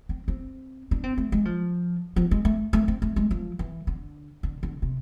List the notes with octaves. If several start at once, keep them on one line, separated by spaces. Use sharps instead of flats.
C4
C4
D4
C4
A3
G#3
F3
F3
G#3
A3
A3
C4
A3
G#3
F3
E3
D3
D3
D3
C3